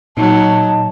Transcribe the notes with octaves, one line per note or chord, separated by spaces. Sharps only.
A#2 F#3 D#4 A5